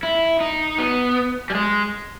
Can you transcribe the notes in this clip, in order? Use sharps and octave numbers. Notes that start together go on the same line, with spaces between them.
E4
D#4
B3
G3
G#3